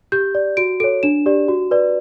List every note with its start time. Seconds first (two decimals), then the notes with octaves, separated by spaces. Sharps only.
0.12 G4 G6
0.35 D5
0.57 F#4 D7
0.80 A4 C#5 D7
1.03 D4 E7
1.26 G4 D5
1.48 F#4
1.71 B4 D5